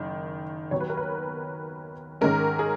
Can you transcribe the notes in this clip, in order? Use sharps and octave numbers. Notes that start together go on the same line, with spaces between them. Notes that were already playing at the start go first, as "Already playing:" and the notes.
Already playing: F#1 D#3
D#2 D#3 F#3 B3 C#5
B4
A#4
B4
G#2 D#3 G#3 C#4 A#4
G#4